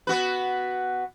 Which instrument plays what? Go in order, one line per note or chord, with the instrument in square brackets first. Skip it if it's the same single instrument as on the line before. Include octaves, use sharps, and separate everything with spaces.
[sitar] B3 F#4 B4